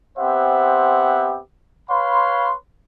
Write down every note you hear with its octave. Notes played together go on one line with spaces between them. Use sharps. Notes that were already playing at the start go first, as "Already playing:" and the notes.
B3 C4 G4 C5 E5 F#5
B4 C#5 F5 B5 C6